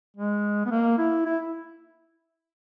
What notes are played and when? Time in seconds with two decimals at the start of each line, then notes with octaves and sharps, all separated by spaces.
0.17 G#3
0.66 B3
0.71 A#3
0.98 E4
1.26 E4